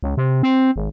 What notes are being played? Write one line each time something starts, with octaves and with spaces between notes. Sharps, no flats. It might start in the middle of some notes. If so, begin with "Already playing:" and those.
C#2
C3
C4
G#1